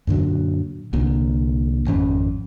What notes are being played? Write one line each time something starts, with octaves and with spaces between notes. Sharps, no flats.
F#2 A#2 D3 F#3
C2 A#2 D3
G#1 F2 C#4